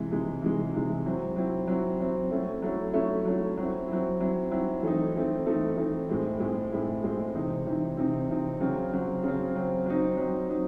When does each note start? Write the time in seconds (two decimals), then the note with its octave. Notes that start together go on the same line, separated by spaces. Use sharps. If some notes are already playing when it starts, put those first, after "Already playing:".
Already playing: C3 E3 G#3
0.11 C3 E3 G#3
0.42 C3 E3 G#3
0.74 C3 E3 G#3
1.05 F#3 C4 E4
1.36 F#3 C4 E4
1.67 F#3 C4 E4
2.00 F#3 C4 E4
2.31 F#3 A3 C#4 E4
2.62 F#3 A3 C#4 E4
2.93 F#3 A3 C#4 E4
3.25 F#3 A3 C#4 E4
3.57 F#3 C4 E4
3.88 F#3 C4 E4
4.20 F#3 C4 E4
4.51 F#3 C4 E4
4.83 E3 A3 C4 D#4
5.15 E3 A3 C4 D#4
5.46 E3 A3 C4 D#4
5.77 E3 A3 C4 D#4
6.09 A2 G#3 C4 E4
6.40 A2 G#3 C4 E4
6.72 A2 G#3 C4 E4
7.03 A2 G#3 C4 E4
7.35 C3 E3 C4 D#4
7.66 C3 E3 C4 D#4
7.97 C3 E3 C4 D#4
8.29 C3 E3 C4 D#4
8.61 C#3 F#3 C4
8.91 C#3 F#3 C4
9.23 C#3 F#3 C4
9.55 C#3 F#3 C4
9.86 F#3 C4 D#4
10.17 F#3 C4 D#4
10.49 F#3 C4 D#4